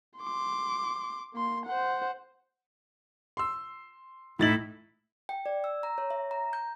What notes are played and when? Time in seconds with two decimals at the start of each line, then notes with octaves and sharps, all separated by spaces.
0.19 C6 D6
1.34 A#3 C6
1.66 C5 F#5
3.37 C6 E6
4.39 A2 D#4 E4 A6 F#7
5.29 G5
5.46 D5
5.64 E6
5.83 A#5
5.98 C#5
6.10 E5
6.31 A#5
6.53 G6